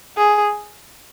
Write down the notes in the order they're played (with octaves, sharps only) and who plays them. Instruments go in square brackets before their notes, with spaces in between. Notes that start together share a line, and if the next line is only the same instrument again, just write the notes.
[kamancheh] G#4